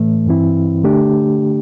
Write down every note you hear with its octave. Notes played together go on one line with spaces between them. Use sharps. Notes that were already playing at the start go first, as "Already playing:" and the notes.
Already playing: A2 E3 A3
G2 E3 C4 E4
D3 A3 D4 G4